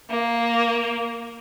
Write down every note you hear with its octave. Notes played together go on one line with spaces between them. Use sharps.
A#3